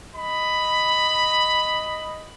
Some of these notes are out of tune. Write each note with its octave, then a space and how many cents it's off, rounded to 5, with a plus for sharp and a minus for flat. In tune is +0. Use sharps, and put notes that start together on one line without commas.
D#5 +0 B5 +5